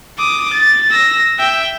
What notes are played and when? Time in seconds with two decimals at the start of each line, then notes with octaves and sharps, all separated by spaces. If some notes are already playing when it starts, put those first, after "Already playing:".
0.18 D6 D#6
0.53 A6
0.91 E6 A#6
1.38 E5 G5